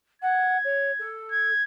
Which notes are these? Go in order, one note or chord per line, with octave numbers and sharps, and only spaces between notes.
F#5 G#6
C#5
A4
G#6